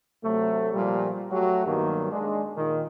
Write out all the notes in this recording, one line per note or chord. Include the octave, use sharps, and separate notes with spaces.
C3 F#3 A3
A#2 F3 G3
F#3 A3 F#4 G4
G2 D#3 F#3 A#3 B3
G#3 D4
A#2 D#3